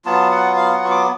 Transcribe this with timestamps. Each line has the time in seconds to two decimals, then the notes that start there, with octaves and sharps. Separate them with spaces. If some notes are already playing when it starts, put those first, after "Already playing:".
0.05 F#3 B3 F4 A5
0.31 F#5
0.56 F5
0.74 F#5
0.85 C#6
0.91 D6